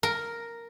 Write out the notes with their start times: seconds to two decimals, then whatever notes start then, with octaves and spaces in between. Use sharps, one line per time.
0.03 A#4